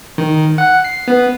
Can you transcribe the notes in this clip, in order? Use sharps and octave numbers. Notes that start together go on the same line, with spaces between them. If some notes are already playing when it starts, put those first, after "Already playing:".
D#3
F#5
C7
B3